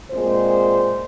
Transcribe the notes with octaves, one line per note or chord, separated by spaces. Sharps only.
A#2 G#3 C4 C5